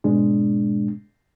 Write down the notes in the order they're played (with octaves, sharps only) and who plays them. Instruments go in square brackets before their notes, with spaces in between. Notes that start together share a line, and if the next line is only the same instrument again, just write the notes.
[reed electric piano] G#2 B2 G#3 D4